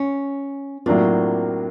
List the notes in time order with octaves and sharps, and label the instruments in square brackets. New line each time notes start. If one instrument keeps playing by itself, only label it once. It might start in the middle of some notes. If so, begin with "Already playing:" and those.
Already playing: [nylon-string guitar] C#4
[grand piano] A2 F#3 A#3 D4 F4 [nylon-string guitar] C4